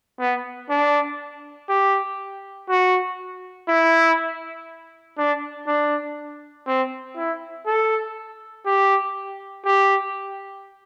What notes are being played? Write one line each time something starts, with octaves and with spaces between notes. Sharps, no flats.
B3
D4
G4
F#4
E4
D4
D4
C4
E4
A4
G4
G4